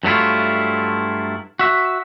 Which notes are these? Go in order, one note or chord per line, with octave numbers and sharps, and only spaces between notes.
G2 F#3 A3 E4 F4
F#4 E5